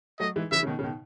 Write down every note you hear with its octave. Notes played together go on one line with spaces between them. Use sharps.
F#3 A3 D#5
E3 G#3
C#3 E3 E5
C#3
B2 D#3
C#3
B2 D#3